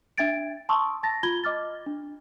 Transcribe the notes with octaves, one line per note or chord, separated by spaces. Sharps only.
D4 E5 G5 G#6 A6 D7
A5 C6 C#6 D#6 E6
A5 A6 A#6
F4 B5 G#6 G7
D#5 D6 F6 A6
D4